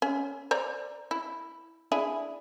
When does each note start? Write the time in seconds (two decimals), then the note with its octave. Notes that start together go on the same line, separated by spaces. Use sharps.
0.02 C#4
0.51 C5 D5 A#5
1.11 E4
1.92 D4 E4 G#4